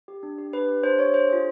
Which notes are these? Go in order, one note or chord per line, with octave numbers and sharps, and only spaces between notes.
G4
D4
G4
D4 B4
G4
D4 C5
G4 C#5
D4 C5
F4 G#4